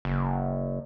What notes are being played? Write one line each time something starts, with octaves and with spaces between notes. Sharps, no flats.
F#1